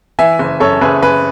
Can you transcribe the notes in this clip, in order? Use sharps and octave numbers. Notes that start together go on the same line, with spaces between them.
E3 E5 G#5
F#1
F#2 A4 C#5
F#1 G#4 B4
F#1 G#4 B4